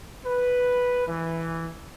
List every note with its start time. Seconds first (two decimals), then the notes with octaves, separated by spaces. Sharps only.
0.24 B4
1.07 E3